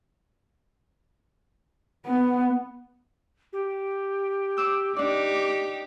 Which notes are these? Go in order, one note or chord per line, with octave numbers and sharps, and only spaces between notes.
B3
G4
D6 E6 G6
D4 D#4 G4 D5 D6